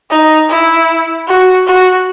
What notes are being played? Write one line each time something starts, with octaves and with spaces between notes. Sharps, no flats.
D#4
E4
F#4
F#4